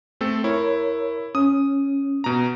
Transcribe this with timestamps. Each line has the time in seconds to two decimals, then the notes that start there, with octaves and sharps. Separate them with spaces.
0.21 A3 C4 A4
0.44 E4 A#4 C#5
1.35 C#4 D#6
2.24 B2 A#5